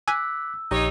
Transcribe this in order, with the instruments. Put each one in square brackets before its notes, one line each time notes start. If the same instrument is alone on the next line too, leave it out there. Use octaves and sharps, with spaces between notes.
[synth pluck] G#5 [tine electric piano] D6 F#6 B6 [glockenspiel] E6
[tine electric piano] A#1 G4 [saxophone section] D#4 C#5